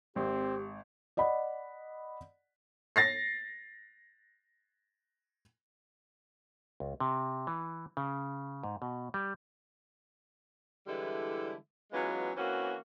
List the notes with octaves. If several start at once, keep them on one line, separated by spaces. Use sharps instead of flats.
G#1 C4 G4
D5 D#5 F#5 B5
A6 A#6 C7
C#2
C3
E3
C#3
G#2
B2
G3
D3 E3 G3 G#3 E4 A4
E3 F#3 G#3 B3 C#4 F4
E3 A#3 C4 C#4 F#4